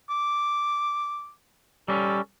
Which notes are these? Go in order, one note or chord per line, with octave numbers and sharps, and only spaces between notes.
D6
G3 C#4 A4